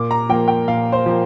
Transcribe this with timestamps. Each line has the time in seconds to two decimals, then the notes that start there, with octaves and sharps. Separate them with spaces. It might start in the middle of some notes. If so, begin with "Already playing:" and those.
Already playing: A#2 D6
0.11 A#5
0.29 F3 A#3 G5
0.48 G5
0.68 A#2 F5
0.92 C5
1.06 F3 A#3